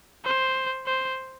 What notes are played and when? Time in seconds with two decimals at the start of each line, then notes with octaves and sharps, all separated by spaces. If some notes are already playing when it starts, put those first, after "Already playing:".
0.25 C5
0.86 C5